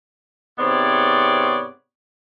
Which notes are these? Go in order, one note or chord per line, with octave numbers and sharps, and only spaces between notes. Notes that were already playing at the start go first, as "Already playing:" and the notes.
G#2 C3 B3 C4 C#5 D5